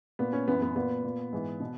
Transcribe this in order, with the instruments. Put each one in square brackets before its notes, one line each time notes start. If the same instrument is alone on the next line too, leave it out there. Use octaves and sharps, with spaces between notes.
[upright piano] A#2 B3
C#4
F#2 E3 B3
B3
A#2 B3
A#2
G#2 E3
B2